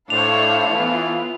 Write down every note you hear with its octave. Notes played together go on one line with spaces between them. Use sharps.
A2 D4 E4 A4 C5 C#5 F5 F7
E3 B3 F4